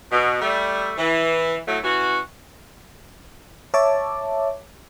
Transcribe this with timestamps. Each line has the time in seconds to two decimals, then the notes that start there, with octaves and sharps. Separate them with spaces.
0.12 B2
0.41 G3 A3
0.98 E3
1.67 A2 F#3 A3
1.83 E3 C#4 F#4
3.74 C#5 E5 A5 D6